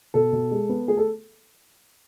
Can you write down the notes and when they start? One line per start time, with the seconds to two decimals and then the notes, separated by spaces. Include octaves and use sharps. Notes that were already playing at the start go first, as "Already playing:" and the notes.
0.14 B2 A4
0.33 B2
0.51 G#3
0.69 B3
0.88 A3 G#4
0.97 A4